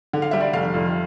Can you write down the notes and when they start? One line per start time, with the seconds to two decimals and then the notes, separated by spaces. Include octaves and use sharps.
0.13 D3
0.22 F5
0.31 G3 E5
0.40 D5
0.53 F1 F5
0.74 F2